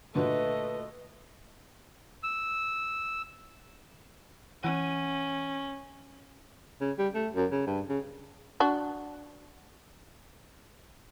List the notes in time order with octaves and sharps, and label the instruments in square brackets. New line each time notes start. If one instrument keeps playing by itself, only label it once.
[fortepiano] A#2 D3 F#4 [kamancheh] A3 D#5 [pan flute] B4
[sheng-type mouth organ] E6
[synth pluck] E3 F#5 D#7 [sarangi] C#4
[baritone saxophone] C#3
G3
A3
F#2
C#3
G2
C#3
[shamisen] D4 F#4